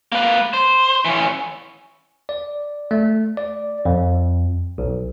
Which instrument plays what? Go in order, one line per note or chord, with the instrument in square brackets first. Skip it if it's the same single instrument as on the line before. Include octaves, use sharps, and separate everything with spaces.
[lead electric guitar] A#3 B4
C5
E3 C#4
[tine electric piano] D5
A3
D5
F2
B1